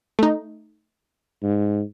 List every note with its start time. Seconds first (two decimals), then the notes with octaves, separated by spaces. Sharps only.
0.19 A3 D#4
1.43 G#2